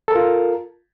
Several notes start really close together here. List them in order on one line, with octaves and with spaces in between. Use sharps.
A4 A#4 F4